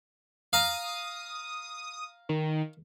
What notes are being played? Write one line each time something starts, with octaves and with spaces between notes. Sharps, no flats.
F5 A#5 D#6
D#3